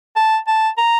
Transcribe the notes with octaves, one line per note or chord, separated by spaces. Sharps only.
A5
A5
A#5